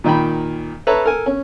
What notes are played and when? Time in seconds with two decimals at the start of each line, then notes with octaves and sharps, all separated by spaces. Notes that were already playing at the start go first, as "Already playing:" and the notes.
0.04 A#2 D#3 G5 B5
0.87 A4 B4 C#5 E5 A5 A#5
1.04 A4 A#4 G#5
1.26 C#4